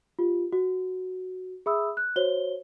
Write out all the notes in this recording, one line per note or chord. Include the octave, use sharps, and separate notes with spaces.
F4 G4
F#4
G#4 E5 B5 D#6 E6
F#6
F#4 C5 C#5 G7